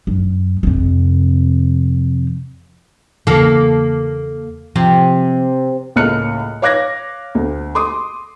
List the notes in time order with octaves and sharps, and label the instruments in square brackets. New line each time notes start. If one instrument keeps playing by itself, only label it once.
[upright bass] F#2
F2 C3
[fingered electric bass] E2 C#3 E3 [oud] A#3 A4
[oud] C3 [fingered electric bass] F3
[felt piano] C#2 A2 A#3 F6 F#6 C#7
C#5 F5 D6 F#6 G#6 A#6
D2
C6 D6 D#6